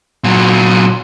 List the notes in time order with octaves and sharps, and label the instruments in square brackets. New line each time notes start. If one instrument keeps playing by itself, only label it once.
[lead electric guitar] A#2 F#3